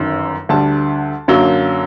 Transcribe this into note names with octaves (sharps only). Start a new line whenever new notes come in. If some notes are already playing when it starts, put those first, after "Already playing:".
Already playing: G1 F#2 D#3
D2 D3 G3 A5
F#2 D3 F#3 A#3